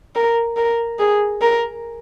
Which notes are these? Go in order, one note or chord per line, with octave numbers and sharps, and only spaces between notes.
A#4
A#4
G#4
A#4